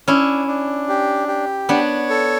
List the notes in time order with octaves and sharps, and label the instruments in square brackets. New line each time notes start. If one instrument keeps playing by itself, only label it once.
[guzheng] C#4 E4 [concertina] D4
[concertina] D4
G4
G4
[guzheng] B3 D4 [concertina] C#5
[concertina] A4